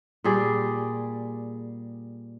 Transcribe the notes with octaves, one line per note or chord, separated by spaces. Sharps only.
A#2 G3 G#4 D5